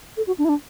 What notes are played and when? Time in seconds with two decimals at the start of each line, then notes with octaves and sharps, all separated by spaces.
0.17 A4
0.27 F#4
0.38 D4
0.45 E4
0.49 D4